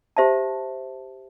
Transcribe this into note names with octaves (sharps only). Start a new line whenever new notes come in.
G4 C5 E5 A5